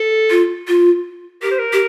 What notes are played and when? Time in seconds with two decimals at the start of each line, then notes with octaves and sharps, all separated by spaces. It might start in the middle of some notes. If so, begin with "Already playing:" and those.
Already playing: A4
0.30 F4
0.68 F4
1.42 G4 A#4
1.51 C5
1.59 A#4
1.73 G4